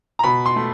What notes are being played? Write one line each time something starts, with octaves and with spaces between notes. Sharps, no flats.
A#5
B2 B5
C6
A3